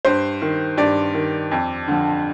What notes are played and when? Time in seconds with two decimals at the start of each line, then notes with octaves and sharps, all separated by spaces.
0.05 G2 C5
0.42 D#3
0.78 G2 D5
1.14 D#3
1.51 F2
1.88 D3 F3